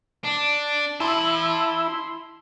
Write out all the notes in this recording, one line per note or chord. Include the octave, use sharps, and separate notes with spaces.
D4
E4 A5 C6